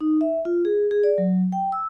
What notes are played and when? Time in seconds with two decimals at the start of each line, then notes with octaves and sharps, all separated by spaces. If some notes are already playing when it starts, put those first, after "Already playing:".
0.01 D#4
0.21 E5
0.45 F4
0.65 G#4
0.91 G#4
1.03 D5
1.18 F#3
1.52 G5
1.72 E6